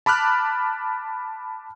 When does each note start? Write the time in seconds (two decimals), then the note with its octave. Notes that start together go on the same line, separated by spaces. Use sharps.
0.06 A5 B5 D6 F6 F#6